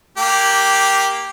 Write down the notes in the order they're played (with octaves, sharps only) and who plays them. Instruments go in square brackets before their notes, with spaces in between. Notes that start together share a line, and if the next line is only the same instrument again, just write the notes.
[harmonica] A#3 G4